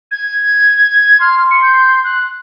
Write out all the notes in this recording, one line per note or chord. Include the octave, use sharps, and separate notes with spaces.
G#6
C6 F6
C#7
G6
F#6